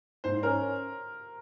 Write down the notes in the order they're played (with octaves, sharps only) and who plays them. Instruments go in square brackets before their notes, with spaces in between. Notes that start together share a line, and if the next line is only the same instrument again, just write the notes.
[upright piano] G#2 [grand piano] C5
[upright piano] C#4 [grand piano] A#4